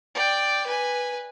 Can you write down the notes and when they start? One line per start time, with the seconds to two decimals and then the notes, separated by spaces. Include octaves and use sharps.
0.15 D5 G5
0.67 B4 G#5